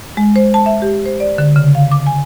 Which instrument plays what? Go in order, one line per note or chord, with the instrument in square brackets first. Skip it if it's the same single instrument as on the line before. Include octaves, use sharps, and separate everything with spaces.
[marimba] G#3
C5
A5
E5
G4
C5
D5
D3
C#3
F5
D6
G#5